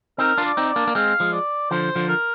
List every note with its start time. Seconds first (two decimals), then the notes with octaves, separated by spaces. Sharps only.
0.18 C4 D#4 A#4
0.38 D4 F4
0.44 D5
0.57 C4 D#4
0.69 D5
0.76 A#3 D4
0.87 A#3
0.95 G#3 C4 F5
1.20 F3 G#3
1.32 D5
1.71 D3 F3 C5
1.96 D3 F3
2.09 A#4